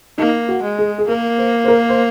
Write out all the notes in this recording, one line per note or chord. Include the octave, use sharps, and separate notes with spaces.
A#3 D#4
F#4
G#3
G#4
G#4
A#3 A#4
C5
C5
A#4
C5